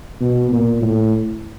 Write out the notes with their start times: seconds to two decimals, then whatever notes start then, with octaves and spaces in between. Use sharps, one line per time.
0.21 B2
0.52 A#2
0.82 A2